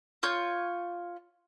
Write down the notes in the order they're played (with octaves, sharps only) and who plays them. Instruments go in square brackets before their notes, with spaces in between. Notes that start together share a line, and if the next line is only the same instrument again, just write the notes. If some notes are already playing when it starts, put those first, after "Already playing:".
[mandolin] F4 C#5 G6